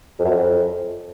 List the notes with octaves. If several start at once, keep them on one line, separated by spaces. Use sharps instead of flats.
F2
F#2
F2